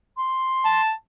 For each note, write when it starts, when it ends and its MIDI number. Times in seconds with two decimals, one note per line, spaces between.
0.17 0.81 84
0.65 0.91 81